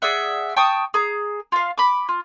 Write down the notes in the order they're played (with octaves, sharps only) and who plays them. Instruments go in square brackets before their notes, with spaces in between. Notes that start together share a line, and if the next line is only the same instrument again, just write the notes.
[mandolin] G#4 D5 E5 F#5
G5 A5 C#6 D#6
G#4 A#5
F4 F5
B5 D6
F4